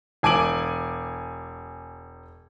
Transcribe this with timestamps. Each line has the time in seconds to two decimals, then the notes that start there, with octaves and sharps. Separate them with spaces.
0.23 E1 G#5 D6 D7 F#7